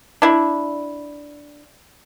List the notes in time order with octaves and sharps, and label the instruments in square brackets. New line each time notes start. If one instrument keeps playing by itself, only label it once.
[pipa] D4 E4